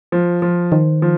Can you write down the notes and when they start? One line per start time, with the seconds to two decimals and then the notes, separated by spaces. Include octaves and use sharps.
0.12 F3
0.42 F3
0.72 D#3 C5
1.02 F3